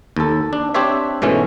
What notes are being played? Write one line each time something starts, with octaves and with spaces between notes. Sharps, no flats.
D#2 A4
D4
C4 D4 G4 C5 C#5 E5
G#2 B2 E3 A3 C#4